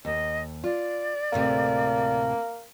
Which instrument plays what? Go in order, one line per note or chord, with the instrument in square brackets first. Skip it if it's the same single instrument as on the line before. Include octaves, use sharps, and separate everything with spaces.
[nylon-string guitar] D#2 [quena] D#5
[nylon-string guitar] F4 [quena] D5
[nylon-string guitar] D2 A2 C3 [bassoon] A#3